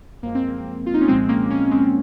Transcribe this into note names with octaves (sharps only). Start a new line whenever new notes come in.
F#2 F3 G#3 A#3
C4
A#3
F4
D#4
C#4
C2 A#2 F3 G#3 C4
A#3 C#4
A#3 C#4
G#3 C4